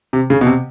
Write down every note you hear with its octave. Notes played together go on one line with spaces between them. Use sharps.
C3
C#3
B2
C3